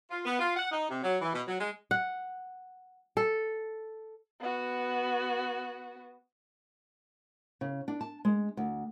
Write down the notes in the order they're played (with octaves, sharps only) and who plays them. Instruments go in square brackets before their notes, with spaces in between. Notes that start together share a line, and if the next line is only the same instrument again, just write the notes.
[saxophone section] F4
B3
F4
F#5
D#4
C3
F#3
E3
B2
F#3
G#3
[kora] F#5
A4
[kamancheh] B3 F#4
[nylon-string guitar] C#3
D4
A5
G#3
D2